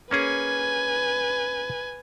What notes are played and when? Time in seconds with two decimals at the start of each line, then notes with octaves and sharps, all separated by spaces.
0.11 A#3 C#4 G#4 B4 G#5